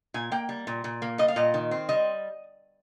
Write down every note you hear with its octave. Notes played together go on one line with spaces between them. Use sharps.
A#2 G#5
A#3 G5
G3
A#2
A#2
A#3
G3 D#5
F5
A#2 D#5
D#3
C4
G3 D#5